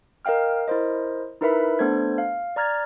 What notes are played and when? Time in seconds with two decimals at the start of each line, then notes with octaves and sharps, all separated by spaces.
0.25 A#4 D#5 F5 G5 F6
0.68 E4 A#4 C5 D#5
1.41 D#4 E4 A#4 B4 E5 B5
1.79 A3 B3 D4 A4 C5 G#6
2.18 F5
2.56 D5 A#5 F6 G#6 A6